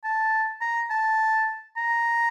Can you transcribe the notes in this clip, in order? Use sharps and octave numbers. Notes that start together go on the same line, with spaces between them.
A5
A#5
A5
A#5